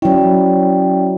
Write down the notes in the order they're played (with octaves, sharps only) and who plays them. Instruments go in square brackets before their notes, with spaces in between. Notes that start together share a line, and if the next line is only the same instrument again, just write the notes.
[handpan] F#3 E4 [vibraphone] C#4 D5 G5